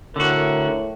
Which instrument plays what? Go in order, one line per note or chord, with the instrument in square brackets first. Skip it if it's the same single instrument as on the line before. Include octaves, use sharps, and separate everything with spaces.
[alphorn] A2 [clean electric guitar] D3 F#4 [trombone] A#4